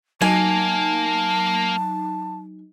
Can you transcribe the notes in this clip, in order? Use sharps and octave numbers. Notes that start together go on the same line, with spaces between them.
F#3 A#3 D#4 G#5 A5